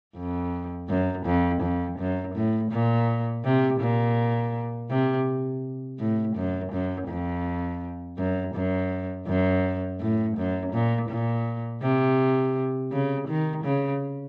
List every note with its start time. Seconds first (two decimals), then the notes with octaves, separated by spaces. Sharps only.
0.16 F2
0.89 F#2
1.26 F2
1.62 F2
1.99 F#2
2.35 A2
2.72 A#2
3.44 C3
3.80 A#2
4.90 C3
5.99 A2
6.36 F#2
6.72 F#2
7.08 F2
8.18 F#2
8.55 F#2
9.28 F#2
10.00 A2
10.37 F#2
10.73 A#2
11.09 A#2
11.82 C3
12.92 C#3
13.28 D#3
13.65 C#3